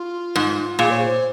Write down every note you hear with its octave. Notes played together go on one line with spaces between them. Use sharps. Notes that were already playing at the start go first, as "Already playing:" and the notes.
Already playing: F4
G#2
A#2 G#4
C#5
C5